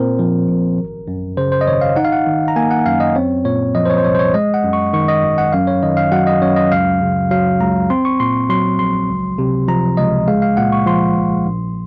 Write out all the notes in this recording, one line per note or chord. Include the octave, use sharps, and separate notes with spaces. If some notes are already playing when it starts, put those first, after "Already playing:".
Already playing: A#2 C4 A#4 C5
F3
A#1
G#1
F#2
C#3 C5
C5
D#5
G#1 C#5
F5
D#4 F#5
F5
F#5
D#3
A#5
A#3 G#5
F#5
F#2 F5
D#5
C4 C#5
A#2 C#5
F3 D#5
C5
C#5
C5
C2 C#5
C5
C#5
G#3 D#5
F#5
F#2
C#6
D#3 C#6
D#5
G#1
F#5
F#2 F5
C#5
D#3 D#5
F5
F#3 F#5
D#5
F#2 C#5
D#5
C#2 F5
C#3
F#3 F5
C#2 A#5
C4 C6
C#6
A#2 C6
F#3 C6
A#1 C6
C#2
C3
F3 A#5
C#2 D#5
G#3 F5
F5
A#2 F#5
C#6
F3 C6
A#1
A#1